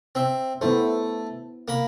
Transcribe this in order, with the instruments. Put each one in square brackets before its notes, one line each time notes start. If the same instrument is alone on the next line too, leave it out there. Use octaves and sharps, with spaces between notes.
[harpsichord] C4 E5
[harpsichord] A3 [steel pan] B3 E4 C5
[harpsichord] A#3 B5